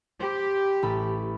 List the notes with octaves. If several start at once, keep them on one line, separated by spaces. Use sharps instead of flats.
G4 C5 B5
A1 A4 B5